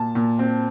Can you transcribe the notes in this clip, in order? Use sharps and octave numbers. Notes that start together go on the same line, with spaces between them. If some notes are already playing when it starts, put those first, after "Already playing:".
Already playing: A#2 A5
A#2
C4